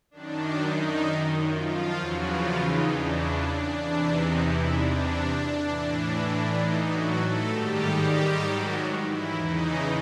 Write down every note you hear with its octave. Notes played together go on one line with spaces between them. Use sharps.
F#2 D#3 D4
D#4
F3 F4
E2 C#3 E3 F#3 F#4
F3 F4
D#4
D4
D4
E2 C3 E3 D4
D#4
E3 E4
D4
A2 E3
D#4
F#3 F#4
A3 A4
G#2 D#3 G3 G4
G3 G4
F#3 F#4
E3 E4
E2 C#3 E3 D#4